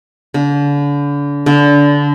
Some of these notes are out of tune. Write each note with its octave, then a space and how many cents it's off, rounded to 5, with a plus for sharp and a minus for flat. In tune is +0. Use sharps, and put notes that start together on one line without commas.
D3 -35
D3 -20